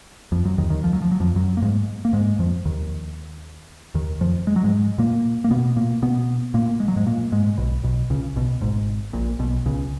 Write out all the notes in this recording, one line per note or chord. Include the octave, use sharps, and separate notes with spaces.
F2 F3
F#2 F#3
D#2 D#3
D#2 D#3
F3
F#3
F3
F#3
F2 F3
F#2 F#3
A#3
G#2 G#3
A#3
G#2 G#3
F2 F3
D#2 D#3
D#2 D#3
F2 F3
G#3
F#3
G#2 G#3
A#2 A#3
A#3
B2 B3
A#2 A#3
B2 B3
A#2 A#3
G#3
F#3
G#2 G#3
A#2 A#3
G#2 G#3
B1 B2
B1 B2
C#2 C#3
B1 B2
G#1 G#2
A#1 A#2
B1 B2
C#2 C#3